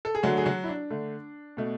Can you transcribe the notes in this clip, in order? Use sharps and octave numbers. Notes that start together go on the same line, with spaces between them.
A4
G#4
D3 F#3 A3 F#4
G#4
F#3 F#4
E4
D4
D3 A3
B2 A3